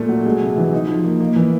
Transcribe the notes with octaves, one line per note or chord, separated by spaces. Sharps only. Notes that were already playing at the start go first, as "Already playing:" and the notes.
Already playing: A#2 A3
F#3
G#3
C3
E3
D#4
F3
A#3
A#3
E3